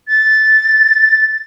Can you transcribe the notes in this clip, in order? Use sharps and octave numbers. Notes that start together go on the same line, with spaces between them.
A6